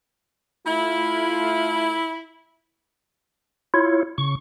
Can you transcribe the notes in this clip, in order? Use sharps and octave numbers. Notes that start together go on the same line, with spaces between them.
A3 E4 F4
E4 F4 C#5
C#3 C#6